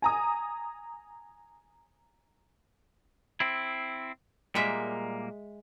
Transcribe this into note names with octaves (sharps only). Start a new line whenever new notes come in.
G#5 A#5 D#6
C4 E4
A#2 G3 G#3 A#3 E5